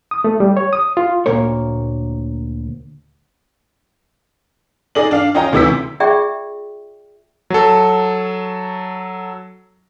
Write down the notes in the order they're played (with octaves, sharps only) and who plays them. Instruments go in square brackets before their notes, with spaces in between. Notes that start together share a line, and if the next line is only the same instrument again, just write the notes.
[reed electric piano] D#6
A3
G3
C#5
D#6
F4
[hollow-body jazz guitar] D2 A#2 A#3 A#4 C#5
[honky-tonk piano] D#4 G#4 D5 D#5 F#7
D4 F5
C#4 F4 D#5 G5 A#5
D2 C3 E3 E6 B6
[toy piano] F4 G4 G#4 D5 E5 G5
[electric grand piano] F#3 A4